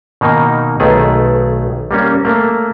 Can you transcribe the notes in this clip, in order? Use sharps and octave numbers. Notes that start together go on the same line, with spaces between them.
B2 D#3 A#3 D#4
B1 D#3 A3 G#4
G3 A#3 C#4
A3 A#3